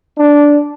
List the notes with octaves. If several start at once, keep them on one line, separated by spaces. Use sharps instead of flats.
D4